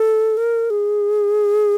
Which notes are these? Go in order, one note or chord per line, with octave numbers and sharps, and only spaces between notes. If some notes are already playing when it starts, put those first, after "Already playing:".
Already playing: A4
A#4
G#4